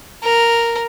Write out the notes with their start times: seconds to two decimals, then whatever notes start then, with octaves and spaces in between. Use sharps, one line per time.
0.24 A#4